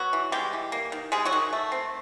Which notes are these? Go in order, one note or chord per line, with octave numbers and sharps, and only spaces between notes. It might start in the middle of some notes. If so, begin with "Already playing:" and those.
Already playing: F#3 B3 F#4
E3
G3 G#3 G4
E3
A#3
D#3
G3 G#3 G#4
F#3 F#4
D#3
A3
C4